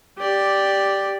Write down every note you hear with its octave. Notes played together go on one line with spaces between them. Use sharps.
G4 D5